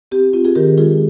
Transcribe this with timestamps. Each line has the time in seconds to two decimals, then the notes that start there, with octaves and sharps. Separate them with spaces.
0.11 C4 G4
0.33 C4 F4
0.45 F4 G#4
0.55 D#3 G4 A#4
0.78 G#3 F4 G#4